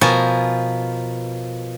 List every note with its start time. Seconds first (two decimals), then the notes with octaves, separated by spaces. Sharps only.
0.01 B2 F3 A#4 G#5 A5